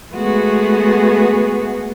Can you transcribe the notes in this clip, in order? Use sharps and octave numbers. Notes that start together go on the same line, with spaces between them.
G#3 A3 B3 F#4 G#4